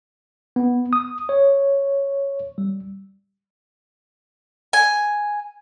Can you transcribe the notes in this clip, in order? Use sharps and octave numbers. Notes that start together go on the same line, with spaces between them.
B3
D#6
C#5
G3
G#5